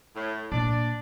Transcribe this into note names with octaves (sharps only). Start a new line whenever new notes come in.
A2
A#2 D4 D5